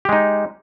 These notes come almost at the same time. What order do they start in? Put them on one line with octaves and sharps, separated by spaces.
G4 G#3 D#4